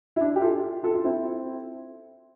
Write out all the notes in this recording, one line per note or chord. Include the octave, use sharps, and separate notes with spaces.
E4
D4
G4
F4 A4
F4 A4
F4
C4 E4